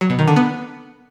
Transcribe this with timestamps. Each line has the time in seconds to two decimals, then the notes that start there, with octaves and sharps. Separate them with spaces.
0.01 F#3
0.10 B2
0.19 D#3
0.28 D3
0.36 B3